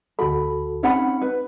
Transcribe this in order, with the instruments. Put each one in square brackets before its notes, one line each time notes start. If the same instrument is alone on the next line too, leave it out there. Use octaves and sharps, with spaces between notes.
[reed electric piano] D2 F#4 A4 [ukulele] B5
[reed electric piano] C4 D#4 [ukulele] C#4 F#5 B5
[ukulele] B4